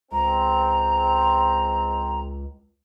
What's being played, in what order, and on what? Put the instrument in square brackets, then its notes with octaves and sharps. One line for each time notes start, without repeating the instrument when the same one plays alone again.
[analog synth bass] C#2 [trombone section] G#3 C4 [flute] A#5